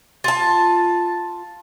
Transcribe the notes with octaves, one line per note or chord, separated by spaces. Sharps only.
F4 A5